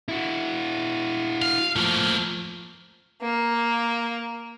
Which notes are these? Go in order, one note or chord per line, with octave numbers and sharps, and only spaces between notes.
E4 F#4
F5
F3 A3 A#3 F4
A#3